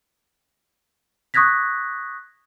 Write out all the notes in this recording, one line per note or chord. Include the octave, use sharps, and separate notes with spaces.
C#6 D#6 F#6 G#6 A#6 B6